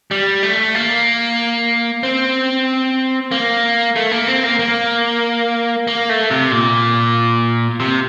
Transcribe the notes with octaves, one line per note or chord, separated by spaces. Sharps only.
G3
A3
A#3
C4
A#3
A3
A#3
C4
A#3
A#3
A#3
A3
C3
A#2
C3